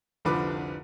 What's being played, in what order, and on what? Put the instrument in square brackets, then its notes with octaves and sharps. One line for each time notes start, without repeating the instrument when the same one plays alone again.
[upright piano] F1 C2 D3 F3 B4 D6